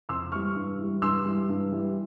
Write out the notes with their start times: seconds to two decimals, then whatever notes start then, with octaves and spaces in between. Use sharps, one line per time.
0.09 F2 C6 E6
0.32 E3 G3 C#6 F6
0.55 G2
0.78 E3
0.83 G3
1.02 G2 C6 E6
1.25 E3 G3
1.49 G2
1.71 E3 G3